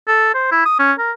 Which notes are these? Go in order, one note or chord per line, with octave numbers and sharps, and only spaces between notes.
A4
C5
E4
D#6
C#4
A#4